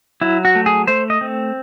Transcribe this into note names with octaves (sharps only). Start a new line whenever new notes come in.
F#3 E4
F#4
A3
G#4
A3 C5
D#5
C4